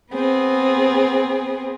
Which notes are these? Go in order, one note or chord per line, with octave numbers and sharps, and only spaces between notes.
B3 C4 G#4